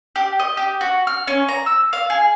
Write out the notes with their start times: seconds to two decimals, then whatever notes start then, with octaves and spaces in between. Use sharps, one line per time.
0.16 G4
0.39 D#5
0.57 G4
0.81 F#4
1.07 F6
1.27 C#4
1.48 A#5
1.66 E6
1.93 F5
2.10 G#4